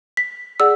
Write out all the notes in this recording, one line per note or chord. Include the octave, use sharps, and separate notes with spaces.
B6
G#4 D5 F#5 E6